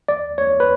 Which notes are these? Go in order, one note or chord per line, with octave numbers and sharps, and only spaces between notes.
D5
C#5
B4